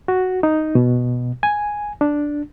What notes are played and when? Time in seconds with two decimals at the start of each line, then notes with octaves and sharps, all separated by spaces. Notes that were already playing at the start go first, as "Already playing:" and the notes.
0.08 F#4
0.43 D#4
0.75 B2
1.43 G#5
2.01 D4